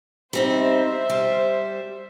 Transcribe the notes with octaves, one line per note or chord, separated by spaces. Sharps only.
G3 C4 D#4 C5 E5
G3